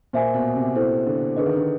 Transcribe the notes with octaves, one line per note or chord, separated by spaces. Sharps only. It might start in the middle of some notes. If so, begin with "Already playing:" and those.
A#2 C5 E5 G#5
B2
C3
E4 A4 C5
D3
D3 G#4 B4 D#5
D#3
D3